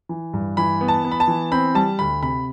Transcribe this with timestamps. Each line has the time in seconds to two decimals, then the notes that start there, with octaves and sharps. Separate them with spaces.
0.09 E3
0.33 G2
0.57 E3 B5
0.81 B3
0.88 A5
1.05 B3
1.12 B5
1.20 A5
1.28 E3
1.52 C4 B5
1.75 G3 A5
1.99 D2 B5
2.22 C3 B5